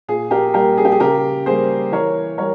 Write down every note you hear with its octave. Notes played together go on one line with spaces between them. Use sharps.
A#2 G#4
G4 A#4
G3 A#3 G4 A#4
G#4
G4
G#4
C#3 G4 A#4
G3 A#3 G#4 C5
E3 A#4 C#5
G3 A#4 C#5